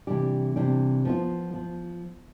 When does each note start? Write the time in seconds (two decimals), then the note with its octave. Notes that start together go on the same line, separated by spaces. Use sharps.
0.07 C3 E3 G3 D4 G4
0.56 C3 E3 G3 D4 G4
1.05 F3 B3 F4
1.54 F3